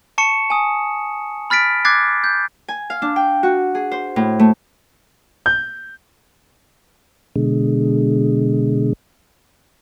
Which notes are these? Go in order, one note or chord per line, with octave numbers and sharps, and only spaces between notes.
A5 C#6 C#7 E7
G#5 D#6
B5 F6 A6 B6 D7
D6 F#6 G#6 A6 C7
G6
G#5
F5
D4
G5
F#4
G#4
C5
A2
A3
G6
B2 D3 G#3